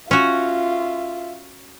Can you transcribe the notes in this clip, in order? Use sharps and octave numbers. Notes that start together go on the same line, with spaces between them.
C#4 F4 F#4 E5